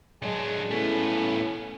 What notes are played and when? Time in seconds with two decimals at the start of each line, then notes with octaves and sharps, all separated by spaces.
0.22 F#3 G#3 D4
0.70 A2 A3 B3 C#4